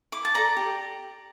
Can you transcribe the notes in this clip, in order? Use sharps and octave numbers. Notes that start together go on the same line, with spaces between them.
E4 D6
A5
A4 D5 A#5
G4